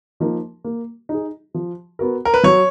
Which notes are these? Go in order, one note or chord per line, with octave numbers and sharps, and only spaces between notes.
F3 A#3 D#4 A#4
A#3
D#4 G#4
F3
B3 F#4 A#4
A#4
B4
F#3 C#5